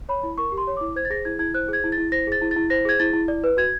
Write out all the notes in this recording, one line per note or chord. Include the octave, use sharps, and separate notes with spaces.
C#5 B5
E4
A#4 C#6
G4
C6
C#5
E4 D6
C5 G#6
A6
G#4 A#6
E4 G#6
E4 G#6
C5 F#6
G#4 G#6
E4
A6
E4
C5 A#6
G#4 A6
E4
A6
E4
C5 A#6
G#4 G#6
E4 A6
E4
D5
B4
F#4 G#6